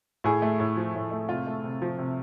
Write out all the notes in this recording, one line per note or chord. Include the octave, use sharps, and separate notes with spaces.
A2 G#4
A3
A2
F3
A2
A3
C3 F4
A3
C3
F3
C3